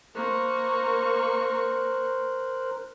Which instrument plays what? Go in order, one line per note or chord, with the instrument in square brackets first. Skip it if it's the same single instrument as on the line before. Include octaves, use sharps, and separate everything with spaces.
[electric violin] A#3 C#6 [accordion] A#4 C5 F#6